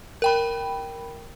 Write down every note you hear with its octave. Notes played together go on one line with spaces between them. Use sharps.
A#4 G5 B5